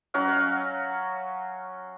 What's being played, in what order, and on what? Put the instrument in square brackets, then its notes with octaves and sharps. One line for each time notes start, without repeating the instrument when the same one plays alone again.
[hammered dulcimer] F#3 C#4 F#4 F5